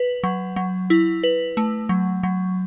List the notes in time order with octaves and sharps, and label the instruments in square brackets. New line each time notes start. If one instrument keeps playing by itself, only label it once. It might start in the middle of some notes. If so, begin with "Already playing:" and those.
Already playing: [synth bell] B4
F#3
F#3
E4
B4
A3
F#3
F#3